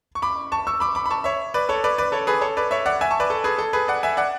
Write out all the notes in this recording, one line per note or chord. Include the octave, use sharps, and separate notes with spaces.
C#6
B5 D6
A5 C#6
C#6 E6
B5 D6
B5 D6
B5
A5 C#6
C#5 E5
B4 D5
A4 C#5
B4 D5
B4 D5
A4 C#5
G#4 B4
A4 C#5
B4 D5
C#5 E5
D5 F#5
E5 G#5
A5 C#6
B4 D5
A4
G#4 B4
A4
G#4 B4
D5 F#5
E5 G#5
D5 F#5